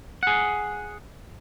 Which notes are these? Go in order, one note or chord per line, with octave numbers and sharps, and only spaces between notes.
G#4 F#5